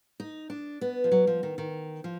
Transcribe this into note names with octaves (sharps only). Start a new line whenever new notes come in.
D#4
D4
B3
F3
F#3
F3
D#3
D#3
F3